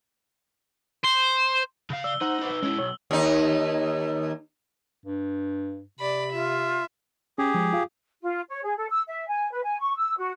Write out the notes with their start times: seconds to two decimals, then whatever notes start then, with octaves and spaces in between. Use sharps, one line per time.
1.04 C5
1.90 C#3 F5
2.04 D5 E6 G7
2.21 D#4 C5 F#5 E6 F#7
2.39 D#4 B4
2.63 G#3 C#4 E4
2.79 B1 C#5
3.11 D#2 D#4
5.06 G2
5.99 C3 D5 B5
6.32 F4 E5
7.38 C#4 G4 G#4
7.54 F3 G#3
7.73 F4 F5
8.22 F4
8.49 C#5
8.63 G#4
8.77 A4
8.90 E6
9.08 E5
9.28 G#5
9.51 B4
9.64 G#5
9.80 C#6
9.97 E6
10.17 F#4